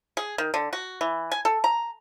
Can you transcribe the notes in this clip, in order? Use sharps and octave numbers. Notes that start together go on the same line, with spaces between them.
G#4
D#3
D3
F#4
E3
G#5
A4
A#5